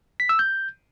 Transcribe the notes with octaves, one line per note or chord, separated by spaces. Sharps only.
B6
E6
G6